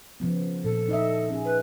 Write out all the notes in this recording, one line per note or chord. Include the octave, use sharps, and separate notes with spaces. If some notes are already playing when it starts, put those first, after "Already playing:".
C#3 F3 B3
A#2 A4
D#4 D#5 E5
C#4 G#4
B4